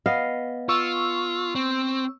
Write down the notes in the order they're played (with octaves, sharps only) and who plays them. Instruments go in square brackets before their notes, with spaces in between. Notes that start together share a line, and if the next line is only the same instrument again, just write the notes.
[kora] B3 D#5 F5
[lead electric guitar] F4 [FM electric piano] C#6 E6
[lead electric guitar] C4